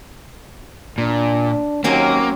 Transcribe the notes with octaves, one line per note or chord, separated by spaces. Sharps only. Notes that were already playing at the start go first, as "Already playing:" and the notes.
A#2 D4
D#2 F#3 A#3 C4 C#4